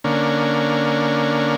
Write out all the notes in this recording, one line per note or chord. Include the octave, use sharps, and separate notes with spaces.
D3 A#3 C#4